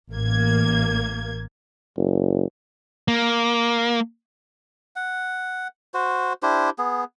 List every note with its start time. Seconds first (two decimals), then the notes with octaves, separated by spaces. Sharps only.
0.11 A1 A#3 G#6
1.97 F#1
3.08 A#3
4.96 F#5
5.94 F#4 C5
6.43 D4 E4 G4 C5
6.78 B3 G#4